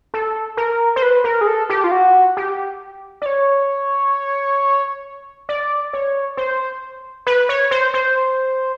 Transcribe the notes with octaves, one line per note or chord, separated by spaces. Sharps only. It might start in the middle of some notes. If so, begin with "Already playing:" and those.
A4
A#4
C5
B4
A#4
G#4
A4
G4
F4
F#4
G4
D5
C#5
D5
C#5
C5
B4
C#5
C5
C5